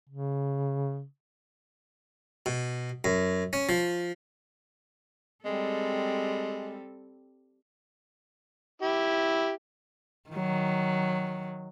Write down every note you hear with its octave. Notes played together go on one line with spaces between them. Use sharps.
C#3
B2
F#2
C#4
F3
G3 G#3 C4 A4
E4 G4
D#3 F#3